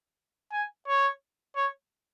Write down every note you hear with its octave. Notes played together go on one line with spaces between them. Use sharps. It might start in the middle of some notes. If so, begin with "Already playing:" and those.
G#5
C#5
C#5